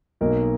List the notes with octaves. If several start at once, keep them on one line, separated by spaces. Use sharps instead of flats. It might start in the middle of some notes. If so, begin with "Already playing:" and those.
B1 B2 A#3 D#4 A#4